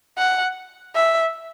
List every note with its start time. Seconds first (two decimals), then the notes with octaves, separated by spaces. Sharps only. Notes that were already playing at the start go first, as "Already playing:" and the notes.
0.18 F#5
0.95 E5